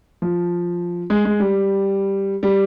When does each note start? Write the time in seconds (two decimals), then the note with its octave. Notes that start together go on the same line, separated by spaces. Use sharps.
0.22 F3
1.10 G#3
1.25 G#3
1.40 G3
2.43 G3